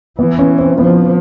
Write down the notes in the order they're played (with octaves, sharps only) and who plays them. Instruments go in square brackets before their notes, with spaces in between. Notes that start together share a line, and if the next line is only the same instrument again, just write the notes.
[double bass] E3 [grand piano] B3
[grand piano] C#4
C4
[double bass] F3 [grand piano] B3